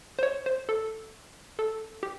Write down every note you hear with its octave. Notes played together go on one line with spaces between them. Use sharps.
C5
C#5
C5
A4
A4
G4